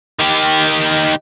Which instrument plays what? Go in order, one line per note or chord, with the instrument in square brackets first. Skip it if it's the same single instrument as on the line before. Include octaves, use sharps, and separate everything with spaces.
[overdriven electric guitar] D#3 G4